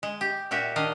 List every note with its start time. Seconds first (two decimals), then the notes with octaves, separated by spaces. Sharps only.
0.03 G#3
0.21 G4
0.51 A#2 F#4 G4 E5
0.76 D#3 D4 D#5 F5